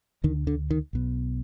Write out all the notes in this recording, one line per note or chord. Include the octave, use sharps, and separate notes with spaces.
D2 D3 D#3
D3
D#3
B1 B2